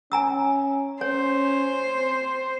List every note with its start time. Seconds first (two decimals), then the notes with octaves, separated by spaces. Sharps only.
0.12 C#4 G#5 A#5 E6
1.01 C#4 C5 C#5
1.95 C4